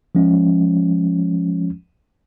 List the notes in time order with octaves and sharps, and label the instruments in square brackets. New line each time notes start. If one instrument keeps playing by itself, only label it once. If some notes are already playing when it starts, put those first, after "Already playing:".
[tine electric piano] F3 G#3 C#4